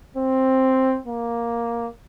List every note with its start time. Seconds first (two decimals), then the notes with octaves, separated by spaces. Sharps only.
0.17 C4
1.07 A#3